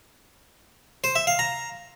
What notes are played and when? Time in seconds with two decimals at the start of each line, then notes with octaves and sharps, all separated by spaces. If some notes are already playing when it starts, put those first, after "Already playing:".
1.04 C5
1.16 E5
1.27 F5
1.39 A#5